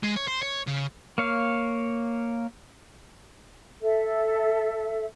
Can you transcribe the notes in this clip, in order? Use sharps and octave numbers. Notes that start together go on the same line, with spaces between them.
G#3
C#5
C5
C#5
C#3
A#3 C#5 F5
A4 E5